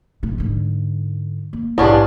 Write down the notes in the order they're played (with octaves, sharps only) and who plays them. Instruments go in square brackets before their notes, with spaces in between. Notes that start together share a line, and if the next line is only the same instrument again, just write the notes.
[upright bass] D1 A3
G#2 D3
A#3
[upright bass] A#1 G#2 [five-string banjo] B3 C#4 D4 [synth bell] E4 G4